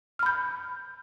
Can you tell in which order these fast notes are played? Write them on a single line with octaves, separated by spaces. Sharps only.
F6 B5 G6